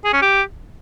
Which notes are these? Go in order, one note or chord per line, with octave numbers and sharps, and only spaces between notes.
G#4
C#4
G4